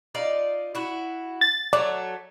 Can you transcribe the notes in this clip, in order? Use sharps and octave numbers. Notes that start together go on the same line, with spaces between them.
D#4 F4 D5
E4 F#4
A6
F#3 A3 D5